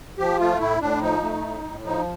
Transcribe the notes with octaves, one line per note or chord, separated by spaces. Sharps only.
F3 G4
A3 F4
A2 E4
A2 D4
F3 D#4
A3
A2
A2
F3 D#4